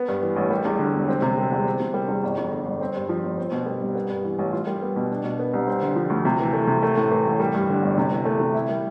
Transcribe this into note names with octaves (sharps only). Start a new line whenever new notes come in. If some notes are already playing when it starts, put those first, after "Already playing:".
Already playing: B3
G2
E3
A1
G3
E2
D3
E1
C4
C3
G3
E2
C4
C3
G3
E2
G1
F2
D3
G1
C4
G2
F3
G1
C4
B2
G3
C2
B3
G2
E3
A1
F4
G3
B3
B2
D4
B2
B3
C2
C4
D3
F3
D2
C3
E3
A3
C3
A3
A2
E3
A1
G3
G2
D3
G1
C3
E3
A3
C3
E4
G3